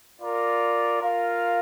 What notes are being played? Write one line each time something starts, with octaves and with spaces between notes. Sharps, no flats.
F4 A#4 D5
F4 A#4 F5